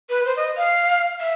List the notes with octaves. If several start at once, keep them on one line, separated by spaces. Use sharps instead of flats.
B4
C5
D#5
F5
E5